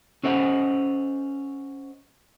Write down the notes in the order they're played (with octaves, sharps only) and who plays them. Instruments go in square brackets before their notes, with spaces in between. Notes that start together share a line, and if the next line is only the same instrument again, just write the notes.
[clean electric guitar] C#4 A4 C5 C#5 D#5 F#5